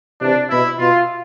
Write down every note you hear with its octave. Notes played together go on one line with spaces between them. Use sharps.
C3 E3 D4
B2 E4
B2 F4